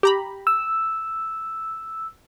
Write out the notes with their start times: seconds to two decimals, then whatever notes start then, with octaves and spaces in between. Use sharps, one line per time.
0.03 G4 A#5 B5
0.47 E6